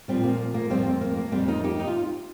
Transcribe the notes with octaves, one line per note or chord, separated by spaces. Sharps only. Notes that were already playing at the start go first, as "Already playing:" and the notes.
A#2 F3 G3 C4
A#3
A#3
F2 F3 G3 C4
A#3
A#3
A#3
F2 D#3 G3 C4
A#3 D#4
D#4 G4
D#4
F4